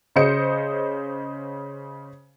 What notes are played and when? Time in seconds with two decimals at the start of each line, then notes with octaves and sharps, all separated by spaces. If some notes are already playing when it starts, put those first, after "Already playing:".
0.16 C#3 C5 D#5 C#7